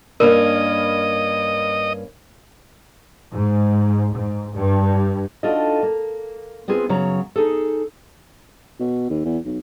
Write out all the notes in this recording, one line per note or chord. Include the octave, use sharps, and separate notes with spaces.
G2 A#3 C#4 A#4 D#5
G#2
G#2
G2
D4 D#4 F4 F#4 A4 D#5
A#3
B3 C4 F4 G#4
F#2 C#3 F#3 C#5 A#5
D#4 G#4 A4
B2
D#2
E2
B1